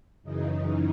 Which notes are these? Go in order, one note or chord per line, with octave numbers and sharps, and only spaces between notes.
F#2 C#3 E3 D#4